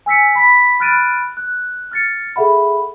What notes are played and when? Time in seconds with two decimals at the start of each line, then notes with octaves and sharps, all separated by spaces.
0.06 G#5 E6 B6 C#7
0.35 B5 B6
0.80 B5 F6 F#6 A6 D7 D#7
1.37 F#6
1.91 F6 A6 C#7
2.36 G#4 A4 E5 F#5 B5